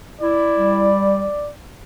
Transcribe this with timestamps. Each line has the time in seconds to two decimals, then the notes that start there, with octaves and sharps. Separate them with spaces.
0.21 E4 D5
0.57 G3